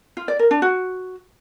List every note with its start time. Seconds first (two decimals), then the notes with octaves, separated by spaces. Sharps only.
0.17 F4
0.28 D5
0.39 A#4
0.51 D4
0.62 F#4